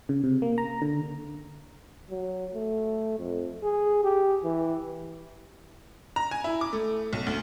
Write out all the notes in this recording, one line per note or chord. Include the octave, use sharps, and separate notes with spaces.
C#3
C3
A#3
A#5
D3
F#3
A3
F2
G#4
G4
E3
A#5
G#5
E4
D6
A3
B1
D2